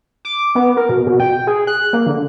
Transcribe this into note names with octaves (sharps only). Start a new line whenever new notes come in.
D6
B3
A#4
B2
B2
G5
G#4
F#6
A#3
D3